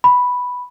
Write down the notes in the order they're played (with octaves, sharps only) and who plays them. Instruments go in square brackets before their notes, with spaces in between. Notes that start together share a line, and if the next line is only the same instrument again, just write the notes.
[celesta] B5